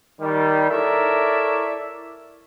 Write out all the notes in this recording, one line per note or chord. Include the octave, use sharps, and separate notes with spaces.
D#3 G3
E4 A4 A#4 C#5 D5 E5